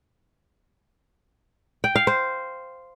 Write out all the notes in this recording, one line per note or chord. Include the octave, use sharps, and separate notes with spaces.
G5
F5
C5